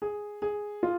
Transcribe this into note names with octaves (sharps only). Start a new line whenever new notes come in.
G#4
G#4
F4